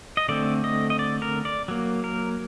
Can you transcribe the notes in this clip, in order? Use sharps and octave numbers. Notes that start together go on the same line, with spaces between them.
D#5
D3 A3 C4 D5
D#5
D#5
D5
A#4
D5
F#3 A#3
A#4